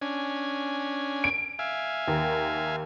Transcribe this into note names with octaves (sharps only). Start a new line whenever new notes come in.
C#4 D4 G#5
D7
E5 F5 G#5
D#2 A#4